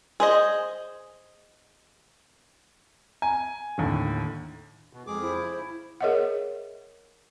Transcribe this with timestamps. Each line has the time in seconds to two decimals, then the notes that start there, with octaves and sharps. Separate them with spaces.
0.20 G#4 C5 D#5
3.22 G#5
3.78 D#2 A2 D3
4.93 B2
5.07 F2 G#3 G#4 D6
5.22 E4 C5
5.36 C#3
6.01 G#4 A#4 C#5 D#5 E5 F#5